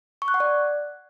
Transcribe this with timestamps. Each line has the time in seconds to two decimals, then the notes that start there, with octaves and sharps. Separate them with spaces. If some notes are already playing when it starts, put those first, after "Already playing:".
0.22 C#6
0.28 F#6
0.34 F#5
0.40 D5